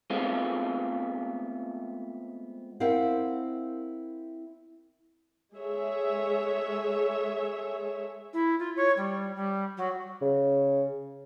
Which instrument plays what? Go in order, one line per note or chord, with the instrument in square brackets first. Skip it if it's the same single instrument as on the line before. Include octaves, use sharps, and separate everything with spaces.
[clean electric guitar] G#3 A3 B3 C4 F4
[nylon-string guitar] C4 E4 A#4 F5 F#5
[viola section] G#3 G#4 A4 C#5 E5
[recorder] E4
F4
C#5
G3
G3
F#3
[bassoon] C#3